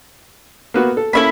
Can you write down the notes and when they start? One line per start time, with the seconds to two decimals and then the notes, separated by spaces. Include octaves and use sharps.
0.74 A#3 B3 F#4
0.97 A4
1.13 A#3 C#4 E4 A4 E5 B5